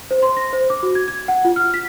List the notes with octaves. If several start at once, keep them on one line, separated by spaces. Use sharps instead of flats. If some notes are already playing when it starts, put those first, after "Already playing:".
C5
C6
A#6
C5
D6
F#4
G#6
G#6
F#5
F4
F6
B6